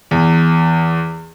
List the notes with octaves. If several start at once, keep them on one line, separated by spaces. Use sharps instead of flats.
E2